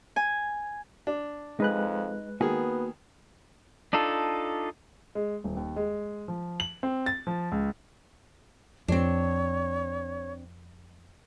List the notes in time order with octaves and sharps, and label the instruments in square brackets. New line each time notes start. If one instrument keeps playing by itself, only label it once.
[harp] G#5
[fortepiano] D4
[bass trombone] F2 [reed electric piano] G#3 B4 F#6 [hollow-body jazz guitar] D#4
[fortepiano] D#3 G#4 [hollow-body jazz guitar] A#3 F#4 G#5 [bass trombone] B3
[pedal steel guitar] D4 D#4 F4 A4
[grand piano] G#3
D#1
D#2
G#3
F3
F#7
C4
A6
F3
C#2
[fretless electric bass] F2 [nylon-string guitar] C4 D4 [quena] C#5